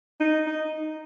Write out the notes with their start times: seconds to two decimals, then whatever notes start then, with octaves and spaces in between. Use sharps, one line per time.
0.20 D#4
0.47 D#4